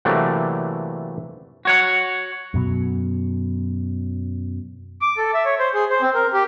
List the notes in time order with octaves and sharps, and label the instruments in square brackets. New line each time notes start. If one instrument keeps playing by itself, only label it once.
[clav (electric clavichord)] C3 E3 F#3 A3 A#3 D4
[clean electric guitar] F#4 C#5 F#5
[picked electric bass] F#2 B2 F#3
[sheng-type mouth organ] D6
A4
E5
C#5
C5
G#4
C5
C4
A#4
G4